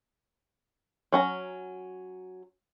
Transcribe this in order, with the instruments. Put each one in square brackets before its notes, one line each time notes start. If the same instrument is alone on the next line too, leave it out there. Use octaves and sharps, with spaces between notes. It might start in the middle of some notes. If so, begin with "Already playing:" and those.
[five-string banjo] F#3 C#4 A#5